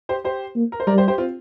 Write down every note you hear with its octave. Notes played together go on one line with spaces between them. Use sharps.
G4 C5
G4 C5
A#3
A#4
C5
G3 A#4 D5
G4 C5
G4 C5
C4 F4